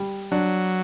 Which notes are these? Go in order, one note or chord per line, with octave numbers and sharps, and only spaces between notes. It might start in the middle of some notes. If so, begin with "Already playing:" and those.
Already playing: G3
F#3 D4